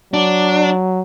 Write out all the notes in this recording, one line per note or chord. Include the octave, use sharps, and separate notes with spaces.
F#3 D4